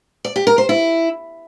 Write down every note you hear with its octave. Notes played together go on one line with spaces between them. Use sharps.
D5
G4
A#4
C5
E4